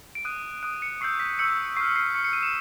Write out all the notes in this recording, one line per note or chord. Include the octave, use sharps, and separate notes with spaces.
D7
D#6 F#6 D#7
D#6 F#6 D7
C#7
C#6 E6 G6 C7
B6
C#6 E6 G6 C#7
C#6 F6 C7
C7
C#6 F6 C#7
C#7
D#7
E7